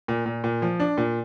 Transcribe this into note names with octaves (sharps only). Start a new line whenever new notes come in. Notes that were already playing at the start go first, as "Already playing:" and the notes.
A#2
A#2
A#2
F3
D4
A#2